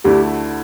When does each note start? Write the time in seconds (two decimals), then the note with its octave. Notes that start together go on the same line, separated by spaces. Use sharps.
0.04 D2 D3 A3 E4 G4